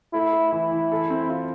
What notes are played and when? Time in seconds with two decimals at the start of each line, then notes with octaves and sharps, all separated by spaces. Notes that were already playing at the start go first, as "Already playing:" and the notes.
0.14 A3 E4
0.33 A3
0.52 E3 E4
0.72 E3
0.92 A4
1.10 C4
1.30 F4